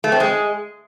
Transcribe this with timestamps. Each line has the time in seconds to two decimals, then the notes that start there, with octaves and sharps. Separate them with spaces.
0.04 A3
0.12 C4
0.20 G#3